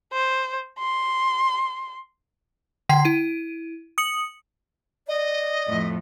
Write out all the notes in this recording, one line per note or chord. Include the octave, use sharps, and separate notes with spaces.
C5
C6
D3 G5 C7
E4 D#7
D#6 C#7 F#7
D5 D#5
F2 A2